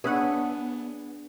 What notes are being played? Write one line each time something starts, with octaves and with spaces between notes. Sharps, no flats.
B3 D4 G#4 B4 C#5 E5 F#5